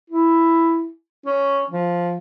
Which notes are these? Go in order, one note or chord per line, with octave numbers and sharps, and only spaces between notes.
E4
C#4
F3